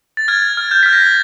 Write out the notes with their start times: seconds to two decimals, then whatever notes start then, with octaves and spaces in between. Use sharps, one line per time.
0.17 A6
0.28 F6 G#6
0.57 F6
0.71 G6
0.83 F6 B6
0.93 A#6
1.04 A6